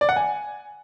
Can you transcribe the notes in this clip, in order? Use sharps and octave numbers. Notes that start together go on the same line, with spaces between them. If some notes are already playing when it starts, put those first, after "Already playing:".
D5
F#5
G#5